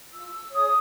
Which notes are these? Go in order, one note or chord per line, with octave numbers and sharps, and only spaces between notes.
F4 E6
G#4 C#5 D#6